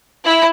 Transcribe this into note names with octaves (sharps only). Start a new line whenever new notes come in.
E4